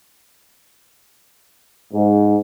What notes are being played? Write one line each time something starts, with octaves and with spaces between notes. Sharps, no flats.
G#2